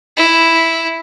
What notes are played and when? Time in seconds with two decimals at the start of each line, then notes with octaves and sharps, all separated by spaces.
0.17 E4